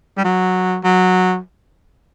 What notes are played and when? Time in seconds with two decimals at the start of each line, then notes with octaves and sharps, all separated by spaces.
0.17 G3
0.24 F#3
0.84 F#3